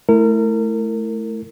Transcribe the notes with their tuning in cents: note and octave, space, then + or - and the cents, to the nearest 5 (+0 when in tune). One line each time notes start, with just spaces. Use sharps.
A3 -15 E4 +0 A#4 -30